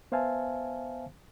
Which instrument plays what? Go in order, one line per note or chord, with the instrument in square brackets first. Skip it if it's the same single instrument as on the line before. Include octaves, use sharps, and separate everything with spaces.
[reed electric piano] B3 C5 E5 F5 G#5 A5